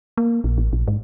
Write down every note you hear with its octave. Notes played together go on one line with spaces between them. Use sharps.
A#3
A#1
A1
A#1
G#2